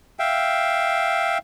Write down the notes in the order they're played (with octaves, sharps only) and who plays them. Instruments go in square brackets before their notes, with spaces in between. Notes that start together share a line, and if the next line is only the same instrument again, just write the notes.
[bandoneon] E5 F5 G5